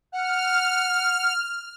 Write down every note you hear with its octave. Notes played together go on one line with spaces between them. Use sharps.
F#5 F6